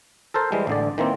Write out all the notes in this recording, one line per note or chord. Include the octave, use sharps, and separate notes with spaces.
A4 A#4 C5 A5
E3 G3 G#3
A1 D3 D5
D#3 E3 A#3 C4